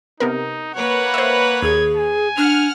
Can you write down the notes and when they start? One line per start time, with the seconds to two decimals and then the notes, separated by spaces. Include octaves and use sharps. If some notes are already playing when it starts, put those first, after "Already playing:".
0.20 C3 B3 D#4 A#4
0.75 A#3 B4 C#5 F#5
1.14 C5 E5
1.62 D#2 G#4 G#6
1.97 G#5
2.37 D4 F#5 F6